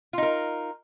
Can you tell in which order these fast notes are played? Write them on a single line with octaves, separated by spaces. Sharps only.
F4 D#4 A#4